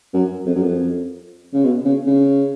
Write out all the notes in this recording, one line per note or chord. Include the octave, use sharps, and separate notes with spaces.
F#2
F2
F#2
F2
C#3
B2
C#3
C#3